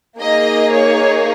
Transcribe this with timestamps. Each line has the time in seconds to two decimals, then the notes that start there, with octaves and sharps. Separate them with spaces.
0.20 A#3 D#4 G#4 D#5
0.73 C#5